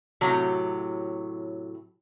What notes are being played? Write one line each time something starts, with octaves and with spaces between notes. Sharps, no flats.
A2 C3 F#3